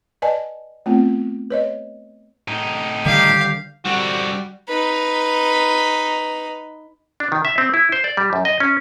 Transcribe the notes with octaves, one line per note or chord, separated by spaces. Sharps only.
B4 D5 D#5 G#5 A5
A3 B3 C4 F4
B4 C#5 D#5
A2 D#4
D3 D#3 G3 G4 F5
D3 G3 C4 F#4 D5 G5
D#4 B4
D4
D#3
E5
C4
E4
C5
D5
G3
F#2
D#5
C#4